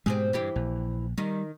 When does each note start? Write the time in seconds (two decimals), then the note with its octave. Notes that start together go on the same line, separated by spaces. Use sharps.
0.06 G#2 B2 G#3 C4 G4 G#4
0.33 G2 E3 E4 G4
0.56 A#1
1.18 D#3 G3 D#4